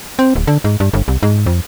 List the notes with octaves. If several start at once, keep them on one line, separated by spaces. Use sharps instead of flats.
C4
D1
D3
G#2
G2
G1
C2
G#2
F2